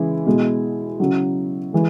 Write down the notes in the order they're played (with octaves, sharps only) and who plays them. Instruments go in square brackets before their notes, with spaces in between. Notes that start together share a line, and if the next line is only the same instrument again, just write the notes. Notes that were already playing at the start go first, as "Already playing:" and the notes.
Already playing: [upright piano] C#3 E3 G#3 E4
B2 G#3
C#3 F#3
E3 G#3